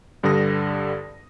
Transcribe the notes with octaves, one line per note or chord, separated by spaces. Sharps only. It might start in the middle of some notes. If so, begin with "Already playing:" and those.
G2 D3 G3 D#6 A#6